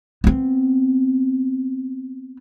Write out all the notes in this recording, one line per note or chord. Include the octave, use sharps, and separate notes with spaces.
B3 C4